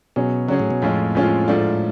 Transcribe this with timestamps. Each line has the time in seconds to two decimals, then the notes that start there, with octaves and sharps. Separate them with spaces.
0.16 B2 F#3 C#4 G#4
0.48 C#3 F#3 C#4 G#4
0.60 A2
0.71 B2
0.82 F2 A2 F3 G#3 C#4 F4
1.15 F2 F3 G#3 C#4 F4
1.48 G#2 F3 A3 D4 F4